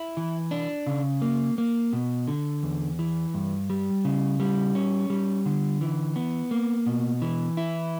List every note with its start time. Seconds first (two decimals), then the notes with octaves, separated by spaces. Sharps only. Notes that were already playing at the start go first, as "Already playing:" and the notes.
Already playing: E4
0.17 E3
0.51 D4
0.87 C#3
1.22 A#3
1.58 A#3
1.93 B2
2.28 D3
2.63 E2
2.99 E3
3.34 G2
3.70 G3
4.05 C#3
4.40 G3
4.75 C#4
5.10 G3
5.46 D3
5.81 E3
6.16 B3
6.51 A#3
6.86 B2
7.22 E3
7.57 E4